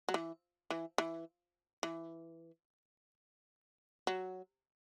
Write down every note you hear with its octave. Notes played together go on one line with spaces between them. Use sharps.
F#3
E3
E3
E3
E3
F#3